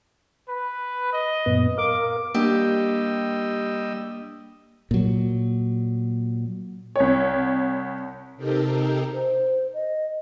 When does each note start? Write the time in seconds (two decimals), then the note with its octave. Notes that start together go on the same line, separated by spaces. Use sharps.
0.49 B4
1.13 D#5
1.46 F#2 A#2 B3
1.78 A#4 F5 D6
2.35 G3 A#3 D4 G4 D#5 E6
4.91 A#2 F#3
6.96 C2 C#5
8.36 C3 C4 D#4 G4 A4 A#4
9.13 C5
9.74 D#5